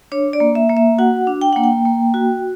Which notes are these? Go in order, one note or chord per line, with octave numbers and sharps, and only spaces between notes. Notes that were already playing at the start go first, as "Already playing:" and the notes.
D4 C#5
D5
A#3
E5
A#3
E5
F#4 F#5
D4
G5
A#3 F#5
G5
A#3
F#4